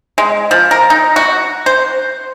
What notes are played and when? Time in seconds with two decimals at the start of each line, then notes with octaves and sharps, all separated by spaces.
0.18 G#3
0.51 F3
0.71 A#4
0.90 D#4
1.16 F#4
1.66 C5